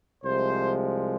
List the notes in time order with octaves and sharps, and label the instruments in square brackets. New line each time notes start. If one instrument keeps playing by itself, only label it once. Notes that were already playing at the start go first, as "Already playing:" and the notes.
[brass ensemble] C2 C3 F3 G#3 C5